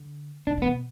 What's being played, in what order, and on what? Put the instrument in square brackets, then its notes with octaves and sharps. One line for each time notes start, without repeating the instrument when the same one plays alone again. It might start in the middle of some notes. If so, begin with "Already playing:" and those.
Already playing: [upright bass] D3
[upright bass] B2 [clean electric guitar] D4
[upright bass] E3
[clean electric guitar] B3
[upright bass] B2